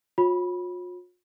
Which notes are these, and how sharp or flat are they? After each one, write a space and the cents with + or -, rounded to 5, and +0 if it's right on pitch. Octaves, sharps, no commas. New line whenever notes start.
F4 +45 C#5 -35 B5 -20